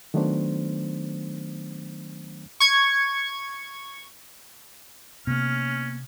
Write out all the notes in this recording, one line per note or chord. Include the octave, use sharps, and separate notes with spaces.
D#3 F#3 A3 B3 D4 C5
C#6 G#6
C3 A#3 B3 C#4 F6